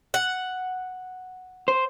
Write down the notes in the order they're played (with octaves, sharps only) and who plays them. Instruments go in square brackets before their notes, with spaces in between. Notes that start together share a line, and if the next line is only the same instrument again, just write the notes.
[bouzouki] F#5
[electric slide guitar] C5